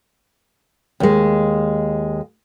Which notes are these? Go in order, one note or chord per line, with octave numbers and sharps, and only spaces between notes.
D#2 G#3